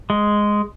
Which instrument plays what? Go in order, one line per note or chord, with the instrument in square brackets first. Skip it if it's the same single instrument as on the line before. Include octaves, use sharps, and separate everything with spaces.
[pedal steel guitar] G#3